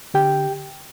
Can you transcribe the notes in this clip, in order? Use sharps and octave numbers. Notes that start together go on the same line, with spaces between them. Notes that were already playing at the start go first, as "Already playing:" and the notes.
D3 G4 G5